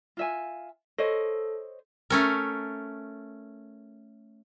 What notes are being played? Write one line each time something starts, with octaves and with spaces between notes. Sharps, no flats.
F4 E5 G#5
A4 C5 C#5 D#5
A3 C#4 A#4